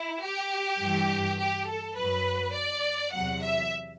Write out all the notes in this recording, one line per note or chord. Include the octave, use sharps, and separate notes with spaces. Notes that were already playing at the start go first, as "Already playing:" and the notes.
Already playing: E4
G4
G2 E3
G4
A4
F#2 F#3 B4
D5
E2 C3 F#3 F#5
E5